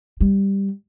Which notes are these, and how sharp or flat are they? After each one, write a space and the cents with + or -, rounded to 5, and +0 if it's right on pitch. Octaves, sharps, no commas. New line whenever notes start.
G3 +5